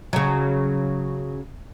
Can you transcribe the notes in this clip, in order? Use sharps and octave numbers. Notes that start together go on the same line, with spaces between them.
C#3 F#3